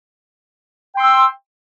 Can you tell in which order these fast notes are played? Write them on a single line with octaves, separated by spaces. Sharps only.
G5 C6 E6